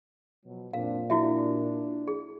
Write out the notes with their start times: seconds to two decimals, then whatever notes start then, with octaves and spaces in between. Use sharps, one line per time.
0.45 B2 F3 F#3
0.73 F#2 A#2 C4 D4 F5
1.10 D4 E4 F#4 E5
2.08 G#4